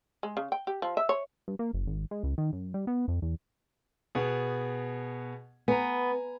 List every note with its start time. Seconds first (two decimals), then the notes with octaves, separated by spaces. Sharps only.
0.23 G#3
0.37 C#3
0.52 G5
0.67 G4
0.82 F3
0.97 E5
1.09 C#5
1.48 G2
1.59 A#3
1.73 F#1
1.87 G#1
2.11 G#3
2.23 C#2
2.38 D#3
2.53 F#2
2.74 G3
2.87 B3
3.08 F2
3.22 E2
4.15 B2 B3 G#4
5.68 B3 G#5 A#5